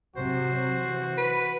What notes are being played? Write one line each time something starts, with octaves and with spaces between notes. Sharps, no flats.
C3 F#3 F#4 C5
E3
B4